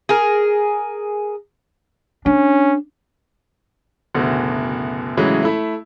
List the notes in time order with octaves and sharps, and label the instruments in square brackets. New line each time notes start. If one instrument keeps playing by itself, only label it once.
[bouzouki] G#4 A#4
[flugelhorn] C#4 [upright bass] D4
[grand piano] F#1 D2 B2
A2 C#3 E3 F#3 G#3
A3 E4